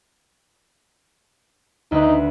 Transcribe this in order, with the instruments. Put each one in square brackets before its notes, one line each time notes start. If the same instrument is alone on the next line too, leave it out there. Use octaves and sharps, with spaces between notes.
[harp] D2 B4 [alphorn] D#4